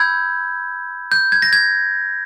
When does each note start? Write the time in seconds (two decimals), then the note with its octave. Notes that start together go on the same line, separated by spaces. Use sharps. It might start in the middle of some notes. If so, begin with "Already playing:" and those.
Already playing: B5 E6 G6 G#6
1.12 G6
1.32 G#6
1.42 A#6
1.53 G#6